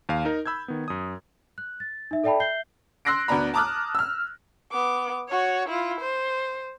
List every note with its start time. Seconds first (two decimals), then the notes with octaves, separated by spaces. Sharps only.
0.09 D#2 F5
0.25 D#4 A#4
0.46 B5 E6 G6 G#6
0.68 D#3 B3
0.88 F#2 D#6
1.58 F#6
1.80 A6
2.11 D#4 E5
2.24 A4 D5 E5 G5 A5 B5
2.40 E5 G6 C7 G7
3.05 C6 E6 F#6 A#6 C7 D7
3.28 D2 B3 D4 A#5 B5
3.54 A5 A#5 D6 D#6 F6 F#6
3.95 E6 F6
4.72 B3 D6
5.30 F#4 C#5
5.69 E4 F4
6.01 C5